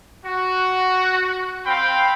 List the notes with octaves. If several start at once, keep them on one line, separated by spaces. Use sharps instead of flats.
F#4
C4 F5 G5 B5